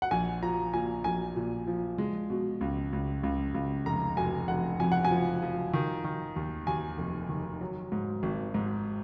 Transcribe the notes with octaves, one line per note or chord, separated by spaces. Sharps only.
F#5
A#1 G#5
F3 A#5
A#2 G#5
A#1 G#5
A#2
F3
G#3
B2
C#2
C#2
C#2
C#2
F1 A#5
F1 G#5
F1 F#5
F2 G#5
F#5
G#5
F3
F3
D#3
D#3
D#2
D#2 G#5
F1
D#3
F#3
G#2
G#1
G#2